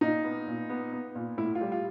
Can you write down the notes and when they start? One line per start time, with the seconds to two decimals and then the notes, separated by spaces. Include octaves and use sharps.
0.01 A#2 D#4
0.24 B3
0.47 A#2
0.69 B3
0.93 B3
1.15 A#2
1.38 A2 E4
1.55 F4
1.61 G3
1.72 F4